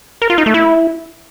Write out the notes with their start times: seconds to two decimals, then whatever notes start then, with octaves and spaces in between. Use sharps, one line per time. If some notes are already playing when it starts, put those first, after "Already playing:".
0.22 A#4
0.30 F4
0.38 D#4
0.46 A3
0.54 E4